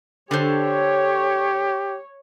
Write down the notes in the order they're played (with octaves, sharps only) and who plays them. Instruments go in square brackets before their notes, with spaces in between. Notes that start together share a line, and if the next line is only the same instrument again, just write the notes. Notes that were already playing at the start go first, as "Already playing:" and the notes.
[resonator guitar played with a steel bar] D3 A4 C5 [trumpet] G4 [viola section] C#5